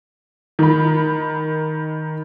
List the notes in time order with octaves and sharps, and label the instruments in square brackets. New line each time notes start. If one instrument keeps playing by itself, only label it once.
[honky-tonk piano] D#3 B5